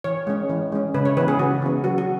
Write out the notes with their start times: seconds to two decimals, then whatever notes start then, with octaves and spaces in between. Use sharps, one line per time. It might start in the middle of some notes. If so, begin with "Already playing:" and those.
0.04 E3 C#5
0.27 G#3 C#4
0.49 E3
0.72 G#3 C#4
0.94 C#3 B4
1.05 C#5
1.17 E3 B3 B4
1.28 G#4
1.39 C#3 F#4
1.62 E3 B3
1.84 F#3 F#4
1.98 F#4